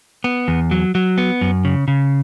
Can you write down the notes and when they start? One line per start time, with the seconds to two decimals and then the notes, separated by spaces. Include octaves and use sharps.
0.24 B3
0.48 E2
0.71 F#3
0.95 F#3
1.18 B3
1.41 F#2
1.65 C#3
1.88 C#3